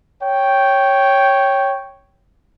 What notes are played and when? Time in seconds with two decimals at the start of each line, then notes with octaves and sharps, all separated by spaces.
0.22 C#5 G5